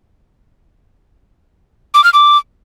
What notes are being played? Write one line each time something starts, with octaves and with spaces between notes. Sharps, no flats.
D6
F6
D6